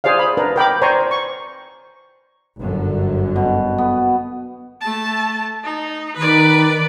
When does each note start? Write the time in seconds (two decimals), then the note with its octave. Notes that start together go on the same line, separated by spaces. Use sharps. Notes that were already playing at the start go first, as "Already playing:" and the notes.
0.04 G#4 C5 D5 F5
0.19 B5
0.37 D4 A#4 B4
0.56 A#4 G5 B5 D6
0.82 C5 D5 G#5 A#5 C6 C#6
1.11 C#6
2.59 G1 F#2 D3
3.36 B2
3.78 B3
4.81 A3 A5
5.64 D#4
6.16 D#3 B4 D5